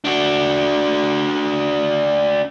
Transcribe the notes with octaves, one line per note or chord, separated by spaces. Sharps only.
D4 F#4